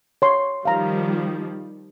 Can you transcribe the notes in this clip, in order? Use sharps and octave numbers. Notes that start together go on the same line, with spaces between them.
C#5 C6
D#3 F3 G3 F5 A#5